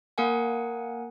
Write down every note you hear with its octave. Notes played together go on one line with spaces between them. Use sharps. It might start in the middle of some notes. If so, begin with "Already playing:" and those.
A#3 A#4 F#5 G#5